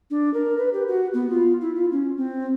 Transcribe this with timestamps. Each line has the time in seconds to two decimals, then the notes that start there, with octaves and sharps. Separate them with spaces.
0.11 D4
0.34 A#4
0.58 B4
0.73 G4
0.88 F#4
1.14 B3
1.30 F4
1.61 E4
1.75 F4
1.92 C#4
2.17 C4